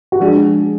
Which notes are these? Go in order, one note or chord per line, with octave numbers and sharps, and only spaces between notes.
F#4
F3 G#3 D4 G#4